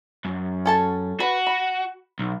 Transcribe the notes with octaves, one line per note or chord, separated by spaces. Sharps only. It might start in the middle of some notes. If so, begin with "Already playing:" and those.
F#2
C#4 A4 A5
F#4 B4
B5
B1